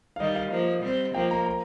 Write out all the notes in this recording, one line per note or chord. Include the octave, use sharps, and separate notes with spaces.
F5
D#3 G3 D#5
F5
F3 A#3
G3 C4
F3 A#3 G5
A#5
A#5